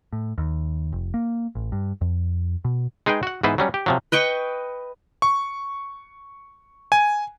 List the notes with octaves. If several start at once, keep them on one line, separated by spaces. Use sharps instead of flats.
A2
D#2
F1
A#3
A1
G2
F2
B2
G#3 D#4 G#4 B4 G5
F#4 F#5
G#2 E3 B3 B4 C5
F#3 G3 C#4
G4
C3 F3 F#3
B4 D#5 G5 C#6
C#6
G#5